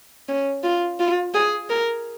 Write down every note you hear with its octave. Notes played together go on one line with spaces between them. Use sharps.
C#4
F4
F4
G#4
A#4